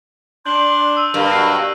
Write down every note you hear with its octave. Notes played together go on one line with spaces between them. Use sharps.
D4 C6 G6 F#7 G7
E6 D#7
G2 A#4
B2 F#3 F#6 C7 D#7